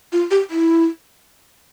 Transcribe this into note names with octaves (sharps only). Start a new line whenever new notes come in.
F4
G4
E4